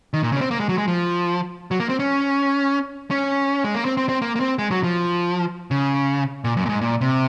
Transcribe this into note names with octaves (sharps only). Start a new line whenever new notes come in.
D#3
A#2
C#3
C#4
C4
A#3
G#3
F#3
G#3
F3
F#3
A#3
C4
C#4
C#4
G#3
A#3
C4
C4
C4
A#3
A#3
C4
G#3
F#3
F3
C#3
A#2
F#2
A#2
G#2
A#2
C3